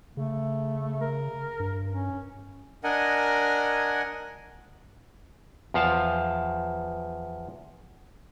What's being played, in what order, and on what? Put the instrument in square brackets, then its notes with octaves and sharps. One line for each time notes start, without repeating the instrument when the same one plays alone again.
[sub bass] C#3 [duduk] A3
[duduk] A#4
[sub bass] G2
[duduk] C#4
[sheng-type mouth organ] D4 A#4 D#5 F#5 G#5
[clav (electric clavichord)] E2 F3 F5 A5